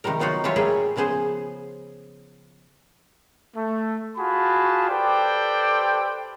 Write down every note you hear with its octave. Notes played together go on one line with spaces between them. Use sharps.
C3 D#3 F3 G3 A#4
F#3 B3 D#4 F4 F#4
E3 F#3 G3 F4 C#5 E5
A2 G3 A#3 G#4 E5 G5
C#3 F3 B3 G#4 C5
A3
F4 F#4 G#4 A5 B5
G4 A4 B4 C5 D5 G5